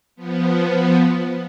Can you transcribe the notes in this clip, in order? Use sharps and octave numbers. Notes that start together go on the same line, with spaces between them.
F3 B3